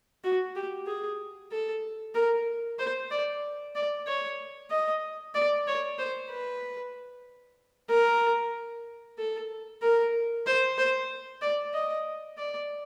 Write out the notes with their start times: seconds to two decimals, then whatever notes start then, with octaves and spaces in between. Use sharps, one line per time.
0.24 F#4
0.55 G4
0.87 G#4
1.52 A4
2.15 A#4
2.79 C5
3.11 D5
3.75 D5
4.07 C#5
4.71 D#5
5.35 D5
5.67 C#5
5.98 C5
6.31 B4
7.90 A#4
9.19 A4
9.82 A#4
10.47 C5
10.78 C5
11.42 D5
11.74 D#5
12.37 D5